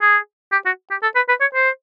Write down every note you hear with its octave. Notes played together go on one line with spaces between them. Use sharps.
G#4
G4
F#4
G4
A4
B4
B4
C#5
C5